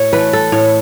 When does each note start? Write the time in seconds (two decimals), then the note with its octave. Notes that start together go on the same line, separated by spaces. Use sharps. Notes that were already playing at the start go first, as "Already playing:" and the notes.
Already playing: A2 C#5
0.13 E3 A3 B4
0.33 A4
0.52 A2 C#5